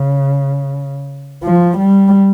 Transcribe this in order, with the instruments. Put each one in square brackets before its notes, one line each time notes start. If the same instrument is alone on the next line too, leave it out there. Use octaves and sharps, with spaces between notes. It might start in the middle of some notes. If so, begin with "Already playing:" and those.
Already playing: [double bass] C#3
F3
G3